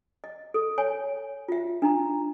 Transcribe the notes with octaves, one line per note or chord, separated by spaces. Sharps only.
D#5
A4
C#5 G#5
F4 E5
D4 D#4 A#5